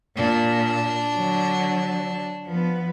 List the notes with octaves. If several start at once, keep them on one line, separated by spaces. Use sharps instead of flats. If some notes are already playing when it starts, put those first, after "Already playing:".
A#2 D4
D3 F#3
F3 B3